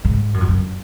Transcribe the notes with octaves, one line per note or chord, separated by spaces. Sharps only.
G#2
F#2
F2
F#2